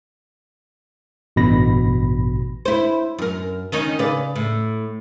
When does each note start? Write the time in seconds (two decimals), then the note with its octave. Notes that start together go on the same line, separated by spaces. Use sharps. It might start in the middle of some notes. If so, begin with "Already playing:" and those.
1.36 A1 G2 B2 B5 A#6
2.65 E4 C5
3.19 F#2 A#4
3.72 D#3 C#4 D#4
3.99 C#3 B4 D5
4.36 A2